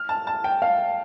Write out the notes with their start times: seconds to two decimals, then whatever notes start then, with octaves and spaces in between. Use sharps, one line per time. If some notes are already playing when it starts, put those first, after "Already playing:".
Already playing: F6
0.09 A5
0.27 A5
0.44 G5
0.62 F5